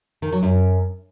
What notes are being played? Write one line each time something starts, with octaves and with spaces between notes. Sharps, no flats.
D#3
F#3
F#2